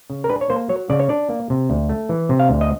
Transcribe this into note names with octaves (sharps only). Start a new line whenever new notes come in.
C#3
A#4
D4 B4
C#5
A#3 C5
F#3 C#5
C#3 D5
C#5
D4 D5
A#3
C3
D2
A3
E3
C3
F5
D2
D#5